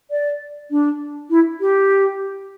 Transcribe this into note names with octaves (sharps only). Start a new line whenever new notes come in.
D5
D4
E4
G4